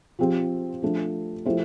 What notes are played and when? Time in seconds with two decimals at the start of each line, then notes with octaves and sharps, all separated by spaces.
0.19 F3 C4 G4
0.82 F3 A3 D4
1.46 F3 A3 E4 G4 C5